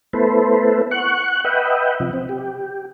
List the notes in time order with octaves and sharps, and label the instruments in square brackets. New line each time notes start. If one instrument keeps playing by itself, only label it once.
[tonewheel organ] A3 B3 E4 A4 B4 C5
F#5 C#6 F#6
B4 D#5 E5 F#5 G5
C3 F3
C4
G4